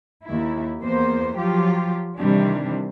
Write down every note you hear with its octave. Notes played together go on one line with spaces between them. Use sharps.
D#2 E4
E2 A#3 B3 C5
F3 F#3 F4 G4
C3 D#3 E3 G3 C4 D4